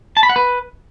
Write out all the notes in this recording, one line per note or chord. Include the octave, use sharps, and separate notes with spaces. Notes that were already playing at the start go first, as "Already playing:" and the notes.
A5
B5
F#5
B4